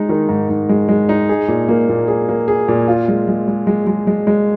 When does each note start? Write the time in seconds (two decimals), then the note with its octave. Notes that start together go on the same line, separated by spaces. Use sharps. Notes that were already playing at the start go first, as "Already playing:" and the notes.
Already playing: G#3 D#4
0.09 D#3
0.29 G#2
0.49 G#2
0.69 G#3
0.89 G#3
1.09 D#4
1.29 G#4
1.48 A#2
1.68 A#3
1.89 A#2
2.08 G#4
2.29 A#3
2.48 G#4
2.68 A#2
2.88 F4
3.08 G#3
3.28 G#3
3.48 G#3
3.67 G#3
3.87 G#3
4.07 G#3
4.27 G#3